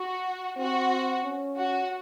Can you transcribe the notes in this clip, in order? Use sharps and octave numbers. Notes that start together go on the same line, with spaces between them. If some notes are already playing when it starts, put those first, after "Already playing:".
Already playing: F#4
C4 F#4
C#4
F#4